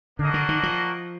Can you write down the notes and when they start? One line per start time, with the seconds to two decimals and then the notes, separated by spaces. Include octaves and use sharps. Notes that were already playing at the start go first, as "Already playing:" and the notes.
0.19 D3 A#3 D4 F#4 A#4 D#5
0.34 D3
0.49 D#3
0.63 F3